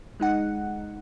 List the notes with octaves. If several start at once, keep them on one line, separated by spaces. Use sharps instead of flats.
G#3 D#4 F#5